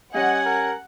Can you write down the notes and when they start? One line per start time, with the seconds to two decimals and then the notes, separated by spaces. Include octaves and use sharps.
0.14 G3 C#4 D#5 F#5 G#5
0.45 A#4